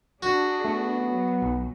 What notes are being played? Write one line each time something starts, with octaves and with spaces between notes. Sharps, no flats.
D4 F#4 G#4
A3 B3
F#3
B1